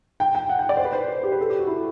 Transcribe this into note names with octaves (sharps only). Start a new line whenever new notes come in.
G5
G5
F#5
G5
D5
C5
B4
C5
B4
G4
B4
A4
G4
F#4
E4